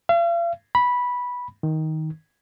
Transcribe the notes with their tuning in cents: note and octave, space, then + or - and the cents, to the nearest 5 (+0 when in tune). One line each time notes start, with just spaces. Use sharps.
F5 -40
B5 -10
D#3 +15